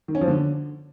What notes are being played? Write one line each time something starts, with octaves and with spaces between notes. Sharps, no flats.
D#3
C#4
F3
D3